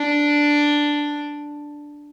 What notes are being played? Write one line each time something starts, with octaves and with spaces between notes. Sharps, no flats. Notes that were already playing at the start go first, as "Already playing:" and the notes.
Already playing: D4